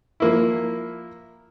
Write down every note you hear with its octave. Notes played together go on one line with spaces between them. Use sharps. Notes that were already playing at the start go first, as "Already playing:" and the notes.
F3 A#3 E4